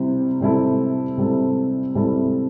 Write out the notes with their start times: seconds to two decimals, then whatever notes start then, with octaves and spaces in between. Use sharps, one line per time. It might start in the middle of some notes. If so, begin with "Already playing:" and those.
Already playing: C3 G3 C4 E4
0.40 C3 G3 C4 E4 A4
1.17 C3 G3 C4 E4 A4
1.95 C3 G3 C4 E4 A4